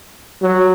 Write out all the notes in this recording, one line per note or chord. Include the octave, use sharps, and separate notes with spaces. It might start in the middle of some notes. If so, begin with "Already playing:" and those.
F#3